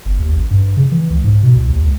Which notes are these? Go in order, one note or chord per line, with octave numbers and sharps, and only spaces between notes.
G1
D#2
A1
G2
C#3
E3
C#2
G#2
B2
C2
D#2
C#2